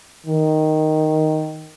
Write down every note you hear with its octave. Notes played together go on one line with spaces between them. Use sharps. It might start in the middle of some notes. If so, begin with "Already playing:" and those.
D#3